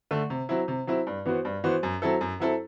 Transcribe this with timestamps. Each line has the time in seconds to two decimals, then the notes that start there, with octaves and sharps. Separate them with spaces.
0.11 D3 A3
0.30 C3
0.49 F#3 C4 E4
0.68 C3
0.87 F#3 C4 E4
1.07 G2
1.25 E3 B3 F#4 C5
1.45 G2
1.64 E3 B3 F#4 C5
1.83 F#2
2.02 F#3 C4 E4 A4
2.21 F#2
2.40 F#3 C4 E4 A4